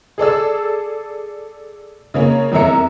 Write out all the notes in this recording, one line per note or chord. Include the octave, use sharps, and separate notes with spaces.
G#4 A4 D5 E6
C#3 A#3 C#4
F1 E2 A#4 E5 A#5 C#7